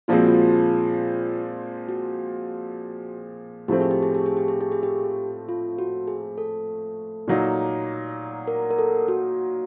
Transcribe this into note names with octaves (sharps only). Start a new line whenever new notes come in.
A#2 F3 G#3 C4 F4
F#4
F4
F#4
A2 F3 A3 C4 G4
G#4
G4
G#4
G4
G#4
G4
G#4
G4
G#4
G4
F4
F#4
G#4
A4
A#2 F#3 A#3 D#4
A#4
A#4
A4
F#4